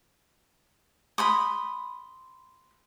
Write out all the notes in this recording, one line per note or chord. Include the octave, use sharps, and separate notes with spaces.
B5 C6 D#6